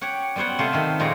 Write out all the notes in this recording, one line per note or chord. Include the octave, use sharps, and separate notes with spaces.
G4 C#5 F#5
G3 B3 C5 C#5 F#5
C3 A3 F4 C5
D#3 A3
F2 A#2 G#3 G4 C#5 A#5